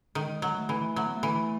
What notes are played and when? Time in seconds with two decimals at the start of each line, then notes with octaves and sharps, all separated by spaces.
0.15 D#3 G#3
0.42 F#3
0.56 A3
0.69 E3
0.96 F#3 A3
1.06 B3
1.17 A3
1.23 E3